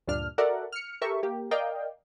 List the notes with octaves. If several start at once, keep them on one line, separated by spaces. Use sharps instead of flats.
D2 G2 A#2 D4 F6
F#4 A4 A#4 D5 E5 F#5
F6 C#7
G4 A4 A#4 E5 C#6
A#3 G4
A#4 D5 D#5 F5 G5